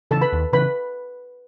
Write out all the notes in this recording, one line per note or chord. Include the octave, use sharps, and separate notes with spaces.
C#3 E3 A4 A5
B4 B5
D#2
C#3 E3 B4 B5